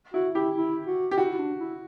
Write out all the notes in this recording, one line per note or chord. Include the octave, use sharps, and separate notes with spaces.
E4 F#4
E4 G4
E4
F#4
G4
E4 F#4
E4
D4
E4